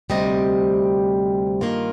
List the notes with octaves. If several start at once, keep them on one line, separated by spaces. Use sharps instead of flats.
D2 C3 G3 C4 D#5
G2 D#3 A#3 F4